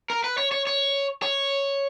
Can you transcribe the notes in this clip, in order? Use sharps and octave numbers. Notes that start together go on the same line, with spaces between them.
A#4
B4
C#5
C#5
C#5
C#5